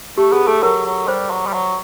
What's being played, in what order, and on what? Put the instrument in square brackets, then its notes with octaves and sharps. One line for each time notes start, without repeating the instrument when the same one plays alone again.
[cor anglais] A3 [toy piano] G4
[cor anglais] B3 [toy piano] G#4
[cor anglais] A3 [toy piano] A4
[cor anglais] F#3 [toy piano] A#4
[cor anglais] F#3
[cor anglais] G3 [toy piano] C5
[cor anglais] F#3
G3
F#3